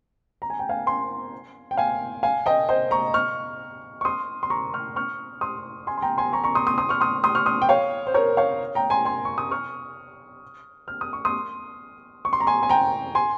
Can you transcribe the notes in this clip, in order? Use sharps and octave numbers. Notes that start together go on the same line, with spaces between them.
A#5
G#5
G5
F5 G#5
G#5 C6
G5
F5 G#5
F5 G#5
D#5 G5
C5 D#5
A#5 C#6
C#6 F6
C#6
C6 D#6
C6
A#5 C#6
C#6 F6
C#6 F6
C6 D#6
G#5 C6
C6
G5 A#5
G#5 C6
A#5 C#6
A#5 C#6
C6 D#6
C6 D#6
C6 D#6
C#6 F6
C6 D#6
C6 D#6
C#6 F6
C6 D#6
G5
C#5 F5
C5
A#4 C#5
C#5 F5
G5 A#5
G#5 C6
G#5 C6
C#6
D#6
C#6 F6
F6
D#6
C#6
C6 D#6
C#6
C6
A#5
G#5 C6
G#5
G5 A#5
G#5 C6